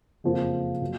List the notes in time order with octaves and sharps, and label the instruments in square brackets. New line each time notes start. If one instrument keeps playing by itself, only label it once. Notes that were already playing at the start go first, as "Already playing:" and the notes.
[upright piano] F#1 F2 F3 A#3
A#2 F#3